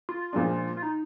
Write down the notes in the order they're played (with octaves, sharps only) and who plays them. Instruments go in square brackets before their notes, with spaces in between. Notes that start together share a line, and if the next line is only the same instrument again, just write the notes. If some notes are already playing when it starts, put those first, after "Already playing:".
[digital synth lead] F4
[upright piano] A#2 F3 G#3 D4
[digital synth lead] F4
D#4